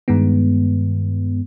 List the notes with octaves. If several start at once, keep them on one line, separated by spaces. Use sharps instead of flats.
G2 D#3 G#3 B3